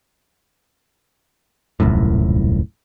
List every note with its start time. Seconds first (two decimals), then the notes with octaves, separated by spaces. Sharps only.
1.80 D#1 C2 F#2 A2